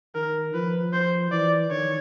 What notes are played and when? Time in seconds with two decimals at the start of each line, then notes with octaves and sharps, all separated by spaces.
0.15 D#3 A#4
0.54 F3 B4
0.93 C5
1.31 E3 D5
1.71 D#3 C#5